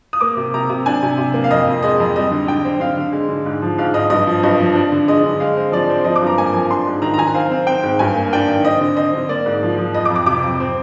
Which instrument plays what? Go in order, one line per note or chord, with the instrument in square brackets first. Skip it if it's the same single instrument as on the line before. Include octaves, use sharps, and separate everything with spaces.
[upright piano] D#6
A#3 D6
C3
C3 A#5
C3
D4 G#5
C3
C3
A#3
F5
F2 D#5
F2
G#3 D#5
F2
G3 D#5
D3
D3 G5
C4
D3 F5
D3
G#3
D3
G#2
F3
G#2 F5
G#2 D#5
G2 D#5
F3
G2 D#5
F3
D4
D3
G#3 D#5
D3
G#3 F5
C4
F3 D5
C4
F3 D#5
D6
G2 A#5
A#3 G#5
F3 G#5
D4 C6
G#2
D#3 A#5
A#5
D#3 G#5
C4 F5
C4
C4 G5
G#2
G2 G#5
A#3
D4 G5
D#3
C4 D#5
D3
C4 D#5
D3
A#3 D5
G#2
F3
F3
F2 D#5
D6
F2
D6
C3 D6
F2
C4